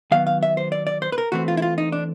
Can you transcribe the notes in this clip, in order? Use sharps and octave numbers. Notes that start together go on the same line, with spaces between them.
D#3 F#3 B3 F5
F5
E5
C5
D5
D5
C5
B4
A#4
E3 A3 C4 F#4
F4
E4
F4
D#4
D4